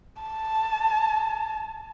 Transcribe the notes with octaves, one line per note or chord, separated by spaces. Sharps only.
A5